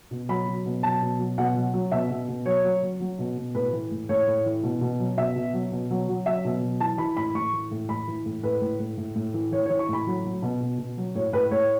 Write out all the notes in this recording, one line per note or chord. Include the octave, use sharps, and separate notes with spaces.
B2
F#3 B5
F#3
B2
F#3 A5
B2
F#3
B2 F#5
F#3
F#3
B2 E5
B2
B2
F#3 C#5
F#3
F#3
F#3
B2
B2
A2 B4
E3
A2
A2 C#5
A2
E3
B2
B2
F#3
B2 E5
B2
F#3
B2
F#3
F#3
F#3 E5
B2
F#3
E3 A5
E3 B5
A2 B5
A2 C#6
E3
A2
A2 B5
E3
A2
A2 B4
A2
A2
A2
A2
E3
E3 C#5
C#5
E3
C#6
A2 B5
F#3
F#3
B2
B2
B2
F#3
A2 C#5
A2 B4
A2 C#5